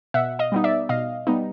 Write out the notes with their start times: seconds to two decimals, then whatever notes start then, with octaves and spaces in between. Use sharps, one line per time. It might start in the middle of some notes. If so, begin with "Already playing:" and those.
0.14 B2 E5 F#5
0.39 D#5 F5
0.52 G3 B3 D#4
0.64 D5 E5
0.89 B2 D#5 F5
1.27 G3 B3 D#4